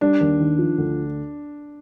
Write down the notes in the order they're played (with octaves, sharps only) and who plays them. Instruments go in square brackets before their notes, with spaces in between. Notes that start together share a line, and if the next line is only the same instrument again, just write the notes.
[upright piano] G3 [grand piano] D4
[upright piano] D#2
D#3
F3
D2